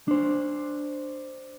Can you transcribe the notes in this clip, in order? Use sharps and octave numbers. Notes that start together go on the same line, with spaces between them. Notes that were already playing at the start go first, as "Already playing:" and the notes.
D4 C5